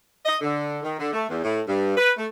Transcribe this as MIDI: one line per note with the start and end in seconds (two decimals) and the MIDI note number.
0.25 0.36 75
0.41 0.77 50
0.83 0.96 51
0.99 1.10 50
1.13 1.26 57
1.28 1.41 40
1.44 1.61 45
1.67 1.92 43
1.97 2.10 71
2.17 2.26 57